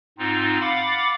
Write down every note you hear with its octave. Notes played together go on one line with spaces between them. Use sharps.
G#2 C4 D#4 F4
F5 F#5 B5 D6 A6